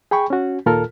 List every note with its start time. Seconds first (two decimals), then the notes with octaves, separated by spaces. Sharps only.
0.11 G#4 G5 B5 C#6
0.30 C#4 F#4
0.66 D#2 A#2 F4 A4 A#4 F6